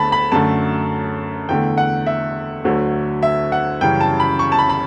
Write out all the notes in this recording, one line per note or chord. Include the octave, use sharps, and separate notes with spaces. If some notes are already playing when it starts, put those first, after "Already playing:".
Already playing: D2 D3 A3 A5 B5
B5
F#2 D3 A3 A5
E2 D3 A3 G5
F#5
E5
D2 D3 F#3 A3
E5
F#5
F#2 C#3 E3 G3 G5
A5
B5
C#6
A5
B5
B5